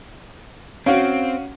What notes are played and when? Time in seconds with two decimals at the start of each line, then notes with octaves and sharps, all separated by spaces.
0.86 C4 C#4 F#4 F5